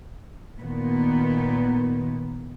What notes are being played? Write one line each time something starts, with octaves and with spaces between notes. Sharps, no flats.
A#2 D#3 B3